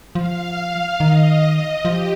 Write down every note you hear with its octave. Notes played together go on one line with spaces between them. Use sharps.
F3 F5
D#3 D#5
F3 G4